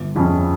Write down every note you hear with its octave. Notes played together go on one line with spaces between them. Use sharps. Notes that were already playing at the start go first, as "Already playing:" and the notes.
Already playing: G1
F2 C#3 F3 C#4